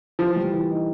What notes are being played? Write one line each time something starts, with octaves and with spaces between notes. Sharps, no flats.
E3 F3
G3
E3
D#4